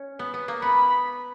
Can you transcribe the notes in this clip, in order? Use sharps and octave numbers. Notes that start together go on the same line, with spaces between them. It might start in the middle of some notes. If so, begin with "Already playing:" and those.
Already playing: C#4
B3
B3
A#3
B3 B5